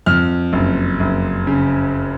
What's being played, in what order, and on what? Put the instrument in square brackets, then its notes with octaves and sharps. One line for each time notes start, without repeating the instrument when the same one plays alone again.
[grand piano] F2 F6
F#1
F#1
C#3